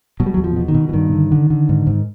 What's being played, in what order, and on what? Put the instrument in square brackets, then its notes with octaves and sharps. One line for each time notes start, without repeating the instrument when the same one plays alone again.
[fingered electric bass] B2 F#3
G3
F#3
E2
F3
B2
D#3
B2
E3
G2 D#3
D3
D3
D3
G#2
G#2